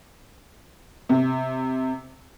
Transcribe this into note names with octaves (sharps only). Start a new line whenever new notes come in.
C3